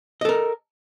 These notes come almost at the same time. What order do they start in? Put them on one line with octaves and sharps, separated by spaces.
D#5 A4 A#4